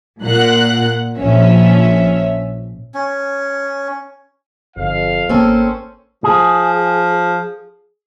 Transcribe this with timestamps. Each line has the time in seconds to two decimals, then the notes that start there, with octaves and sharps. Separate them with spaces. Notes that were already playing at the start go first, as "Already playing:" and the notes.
0.23 A#2 F#5 F#6
1.18 A#1 F3 C#4 E5
2.94 C#4
4.77 G1 F2 F5
5.29 G#1 A#3 C4 C#4 A4 A#4
6.24 F3 G#4